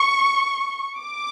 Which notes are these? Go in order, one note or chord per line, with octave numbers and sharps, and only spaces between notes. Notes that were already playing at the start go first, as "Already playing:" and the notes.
Already playing: C#6
D6